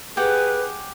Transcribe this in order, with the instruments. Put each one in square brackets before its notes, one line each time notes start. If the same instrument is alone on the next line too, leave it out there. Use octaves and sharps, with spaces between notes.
[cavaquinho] G4 F#5 [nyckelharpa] G#4 [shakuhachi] B4